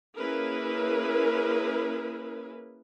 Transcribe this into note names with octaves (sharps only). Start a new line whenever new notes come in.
A#3 C#4 E4 G#4 A#4 B4